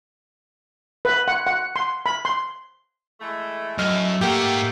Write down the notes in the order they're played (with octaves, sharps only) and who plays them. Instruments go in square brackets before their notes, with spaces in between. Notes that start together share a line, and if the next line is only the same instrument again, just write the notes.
[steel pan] B4
F#5
F#5
C6
B5
C6
[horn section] E3 G#3 A3
[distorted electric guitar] F#2 [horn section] A2 A3 [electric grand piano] D#5 F6
[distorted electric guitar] G#2 F#5 [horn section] A3 G5 [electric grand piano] A#3 G4